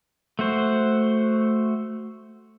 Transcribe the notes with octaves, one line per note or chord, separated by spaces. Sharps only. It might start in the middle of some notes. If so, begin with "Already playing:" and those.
A3 F#4 C5